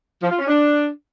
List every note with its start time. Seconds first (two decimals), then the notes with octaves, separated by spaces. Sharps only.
0.22 F3
0.30 F4
0.39 C#4
0.47 D4